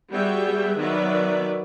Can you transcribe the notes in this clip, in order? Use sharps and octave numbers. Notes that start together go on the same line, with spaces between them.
G3 B3 F#4 G#4 E5 G5
D#3 F#3 B3 B4 D5 E5